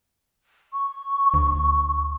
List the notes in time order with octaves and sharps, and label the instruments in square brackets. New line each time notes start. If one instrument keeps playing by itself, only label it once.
[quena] C#6
[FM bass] D2